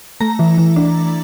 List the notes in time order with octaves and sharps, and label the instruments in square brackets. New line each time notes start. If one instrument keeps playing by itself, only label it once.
[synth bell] A3 A#5
E3
E3
D4